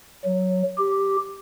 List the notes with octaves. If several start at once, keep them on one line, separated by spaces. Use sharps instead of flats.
F#3
G4